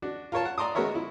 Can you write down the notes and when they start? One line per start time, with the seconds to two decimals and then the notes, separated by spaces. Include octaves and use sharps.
0.02 D4 F#4
0.32 F4 A#4 C#5 A5
0.45 F#5
0.58 D5 A#5 C6 D6 D#6
0.75 G#3 B3 F#4 A#4 C#5 E5
0.95 E4